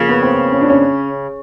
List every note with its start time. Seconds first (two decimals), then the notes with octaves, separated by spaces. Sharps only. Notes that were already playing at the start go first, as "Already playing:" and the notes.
Already playing: C#3 F3 A#3
0.09 B3
0.22 C4
0.52 C#4
0.61 D4
0.70 C#4